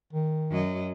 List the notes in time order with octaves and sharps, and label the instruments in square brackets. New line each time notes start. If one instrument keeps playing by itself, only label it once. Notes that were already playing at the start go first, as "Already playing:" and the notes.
[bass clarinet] D#3
[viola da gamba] F#2 F#3 D#5